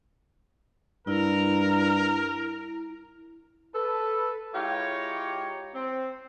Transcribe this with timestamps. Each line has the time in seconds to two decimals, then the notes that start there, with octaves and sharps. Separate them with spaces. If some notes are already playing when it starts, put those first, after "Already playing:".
1.07 G2 E4 A#4
3.75 A4 B4
4.54 G#3 E4 F4 G4 C#5 A#5
5.75 C4